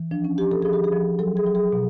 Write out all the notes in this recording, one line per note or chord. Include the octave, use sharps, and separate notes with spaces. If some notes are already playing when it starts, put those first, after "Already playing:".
Already playing: E3
F3 D4
C#4
F3 G4
A4
F3 G#4
G4
G#4
F3
F#3 A4
G#4
F#3
G#4
B2